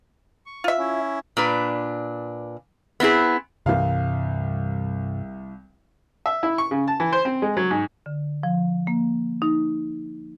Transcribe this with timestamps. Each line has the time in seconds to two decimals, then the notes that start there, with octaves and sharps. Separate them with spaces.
0.46 C#6
0.64 F4 E5
0.78 C#4 E4
1.37 A#2 D4 B4
3.00 B3 C4 E4 G#4
3.66 C2 G2 C3 E3 F5
6.26 E5
6.43 E4
6.58 C#6
6.71 C#3
6.88 A5
7.00 E3
7.13 C5
7.25 C4
7.42 G#3
7.57 F#3
7.71 G#2
8.06 D3
8.43 F3
8.87 A#3
9.42 D#4